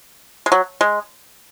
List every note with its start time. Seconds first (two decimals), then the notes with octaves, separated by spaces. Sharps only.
0.46 G#3
0.52 F#3
0.81 G#3